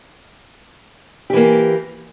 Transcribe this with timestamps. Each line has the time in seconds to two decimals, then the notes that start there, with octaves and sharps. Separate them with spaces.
1.30 G4
1.33 E3
1.37 A#3